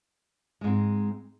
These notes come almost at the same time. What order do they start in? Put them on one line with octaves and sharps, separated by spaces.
G#3 G#2 C4